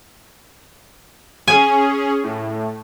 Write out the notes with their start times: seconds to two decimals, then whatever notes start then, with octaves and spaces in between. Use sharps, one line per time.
1.48 C#4 G#4 G#5
2.23 A2